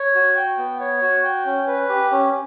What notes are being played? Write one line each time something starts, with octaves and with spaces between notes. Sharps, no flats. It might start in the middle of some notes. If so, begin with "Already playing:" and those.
Already playing: C#5
F#4
G5
B3
C#5
F#4
G5
C#4
B4
G4
C#4